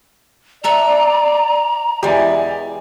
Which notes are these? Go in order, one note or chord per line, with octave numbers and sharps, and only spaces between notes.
A4 D5 E5 F#5 A#5
E2 E3 G#3 G4 D5 G#5